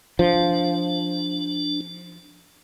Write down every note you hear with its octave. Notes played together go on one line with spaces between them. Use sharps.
F3 D4